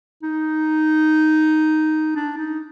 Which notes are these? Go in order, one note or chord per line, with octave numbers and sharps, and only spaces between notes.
D#4
D4
D#4